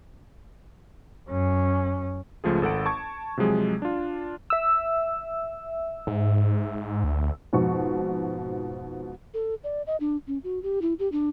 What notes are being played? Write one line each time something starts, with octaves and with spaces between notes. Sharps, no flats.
F#2 C#4
C#2 F3 A3 F4 G#4
G#1 A4 F#5 D7
A5 C#6 G#6
C3 F3 F#3 G#3 G#4
D4 F4
E5 E6
G#2
D2
F2 G#2 B2 C#6
A4
D5
D#5
D4
C#4
F#4
G4
E4
G4
D4